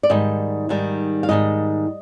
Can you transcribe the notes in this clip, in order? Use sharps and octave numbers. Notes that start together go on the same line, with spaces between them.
D5
G#2 D#3 G3 D#5
G#2 D#3 G3
F5
G#2 D#3 G3 D#5